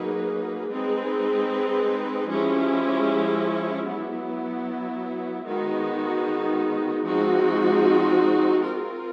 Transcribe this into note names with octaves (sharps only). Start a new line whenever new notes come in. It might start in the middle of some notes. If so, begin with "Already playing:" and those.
Already playing: F#3 A#3 D#4 G#4 B4
G#3 C4 D#4 G#4 B4
F3 G#3 C#4 E4 G4
F#3 B3 E4
D#3 G#3 B3 D#4 F#4
F3 G#3 C4 D#4 F#4
C4 F4 A#4